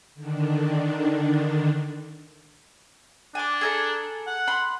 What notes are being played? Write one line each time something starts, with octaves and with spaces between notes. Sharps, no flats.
D3 D#3 D4
D4 G#5 D6
G#4 A4 A#5
F#5
B5 C6